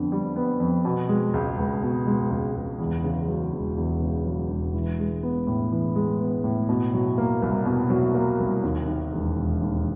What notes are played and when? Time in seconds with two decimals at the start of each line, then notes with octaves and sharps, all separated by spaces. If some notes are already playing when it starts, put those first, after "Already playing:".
Already playing: F2 D3 B3
0.12 G3
0.36 B3
0.60 F2
0.85 B2
1.09 G#3
1.34 C#2
1.57 C#2
1.82 B2
2.07 G#3
2.30 C#2
2.55 C#2
2.79 E2
3.04 C#3
3.28 F#3
3.52 E1
3.77 E2
4.02 C#3
4.26 F#3
4.49 E1
4.73 E3
4.99 G#3
5.23 B3
5.47 A2
5.72 E3
5.95 G#3
6.20 B3
6.44 A2
6.69 B2
6.94 F#3
7.18 A#3
7.42 C2
7.65 B2
7.90 F#3
8.15 A#3
8.39 C2
8.63 D#2
8.87 D#3
9.12 E1
9.37 E1
9.61 D#2